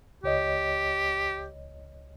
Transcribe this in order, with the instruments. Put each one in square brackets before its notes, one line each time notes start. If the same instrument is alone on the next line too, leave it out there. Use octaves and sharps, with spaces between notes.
[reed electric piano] C#2 C#5 D#5 [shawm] G4